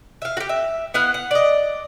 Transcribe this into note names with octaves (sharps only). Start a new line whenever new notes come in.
E5 F5
F#4 G4
E5
B3 E4 F5 F#5
F#5
D5 D#5